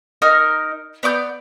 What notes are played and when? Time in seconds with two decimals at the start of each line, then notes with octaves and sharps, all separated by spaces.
0.22 D#4 A#4 F6
1.03 B3 D5 D6 G6